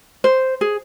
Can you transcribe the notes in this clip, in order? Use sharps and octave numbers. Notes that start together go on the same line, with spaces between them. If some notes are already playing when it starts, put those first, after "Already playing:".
C5
G#4